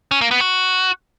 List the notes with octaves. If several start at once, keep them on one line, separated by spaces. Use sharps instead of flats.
C#4
A#3
B3
F#4